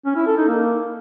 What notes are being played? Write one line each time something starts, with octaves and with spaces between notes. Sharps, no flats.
C#4
E4
A4
D#4
A#3